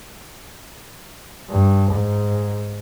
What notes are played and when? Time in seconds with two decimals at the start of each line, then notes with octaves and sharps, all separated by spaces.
1.50 G2
1.92 G#2